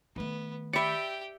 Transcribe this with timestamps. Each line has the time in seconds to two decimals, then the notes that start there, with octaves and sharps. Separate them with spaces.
0.16 D#3 A3 B3
0.73 G4 D5 E5 G5 B5 C#7